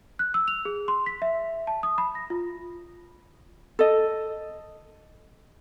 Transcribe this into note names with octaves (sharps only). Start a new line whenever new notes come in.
F#6
E6
F7
G#4
C6
B6
E5
A5
D#6
B5
A#6
F4
A4 D#5